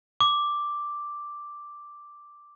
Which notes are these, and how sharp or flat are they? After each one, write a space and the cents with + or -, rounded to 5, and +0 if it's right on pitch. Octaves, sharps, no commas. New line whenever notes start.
D6 +0